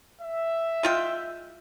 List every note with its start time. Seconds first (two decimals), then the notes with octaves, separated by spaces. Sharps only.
0.22 E5
0.83 G#3 F4 G5